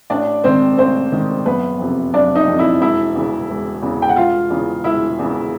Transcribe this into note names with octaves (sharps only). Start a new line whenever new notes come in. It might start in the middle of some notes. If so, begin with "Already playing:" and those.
A1 D4 D5
G#2 D#3 C4 C5
A1 C4 C5
G#2 D#3
F#1 B3 B4
F2 C3
F#1 D4 D5
D#4 D#5
F2 C3
E4 E5
E1 E4 E5
E2 C#3 E3
E1
E2 C#3 E3
G5
F#5
E1 F4 F5
E2 C#3 E3
E1 E4 E5
E2 C#3 E3